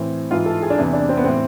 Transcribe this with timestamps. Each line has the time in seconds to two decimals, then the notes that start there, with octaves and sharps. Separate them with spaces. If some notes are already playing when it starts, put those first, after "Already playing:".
Already playing: A2 E3 C4
0.31 G#2 E3 F4
0.46 A4
0.63 G#4
0.70 D4
0.77 E2 C3 E3 E4
0.93 D4
1.09 C4
1.17 B3
1.24 A2 E3 C4